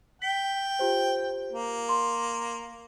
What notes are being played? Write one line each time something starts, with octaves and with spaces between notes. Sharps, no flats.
G5 B6
F4 G4 C5
A#3
C6